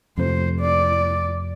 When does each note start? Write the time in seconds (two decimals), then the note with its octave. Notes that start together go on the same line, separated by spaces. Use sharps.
0.18 F2 C3 F3 A3 C5
0.61 D5